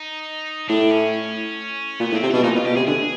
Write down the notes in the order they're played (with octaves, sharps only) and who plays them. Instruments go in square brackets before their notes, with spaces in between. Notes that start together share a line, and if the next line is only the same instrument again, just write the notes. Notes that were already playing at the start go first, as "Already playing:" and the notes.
Already playing: [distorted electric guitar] D#4
[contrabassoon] A2 [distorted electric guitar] D4
[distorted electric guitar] C#4
[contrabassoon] A#2 [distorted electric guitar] B3
[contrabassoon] A2
[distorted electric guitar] C4
[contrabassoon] C3
[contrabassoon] B2 [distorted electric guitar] D4
[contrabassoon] A#2 [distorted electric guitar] D#4
[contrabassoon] B2 [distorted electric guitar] F4
[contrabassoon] B2 [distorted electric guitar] G4
[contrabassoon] C3 [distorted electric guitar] G#4
[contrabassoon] D3 [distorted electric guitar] G#4